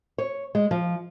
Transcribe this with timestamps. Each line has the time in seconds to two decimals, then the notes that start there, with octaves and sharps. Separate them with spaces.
0.18 C#5
0.55 G#3
0.71 F3